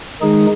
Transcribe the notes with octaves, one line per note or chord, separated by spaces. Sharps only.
D#3 G#3 D#4 G#4